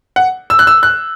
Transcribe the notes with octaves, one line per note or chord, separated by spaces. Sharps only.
F#5
E6
F#6
E6
F#6